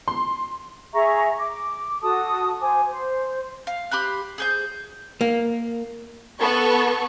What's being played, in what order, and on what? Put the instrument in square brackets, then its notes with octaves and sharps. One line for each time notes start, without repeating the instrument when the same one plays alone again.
[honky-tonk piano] C6
[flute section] G#4 E5 A#5 C#6
D6
F#4 A4 A5 D#6
C5 G#5 D6
C5
[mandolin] F5
G4 C5 B5 F#6
G#4 C5 G6
[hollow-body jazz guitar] A#3
[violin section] B3 A4 C#6